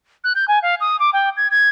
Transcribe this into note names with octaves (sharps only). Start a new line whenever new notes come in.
F#6
G6
G#5
F5
D#6
D6
G5
G#6
G#6